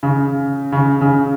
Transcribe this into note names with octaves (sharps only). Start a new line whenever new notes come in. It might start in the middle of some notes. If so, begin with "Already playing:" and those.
C#3
C#3
C#3